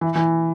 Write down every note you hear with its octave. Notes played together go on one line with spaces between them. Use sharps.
E3
E3